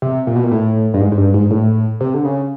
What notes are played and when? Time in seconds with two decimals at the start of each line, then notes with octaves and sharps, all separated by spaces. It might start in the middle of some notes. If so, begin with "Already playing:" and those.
0.02 C3
0.27 A#2
0.36 B2
0.44 A#2
0.51 A2
0.94 G2
1.01 G#2
1.12 G#2
1.17 G2
1.34 G#2
1.51 A2
2.01 C3
2.14 D3
2.25 C#3